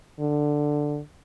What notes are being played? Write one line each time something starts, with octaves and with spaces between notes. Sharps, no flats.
D3